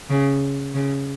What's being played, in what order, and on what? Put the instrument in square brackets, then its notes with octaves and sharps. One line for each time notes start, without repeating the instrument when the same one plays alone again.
[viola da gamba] C#3
C#3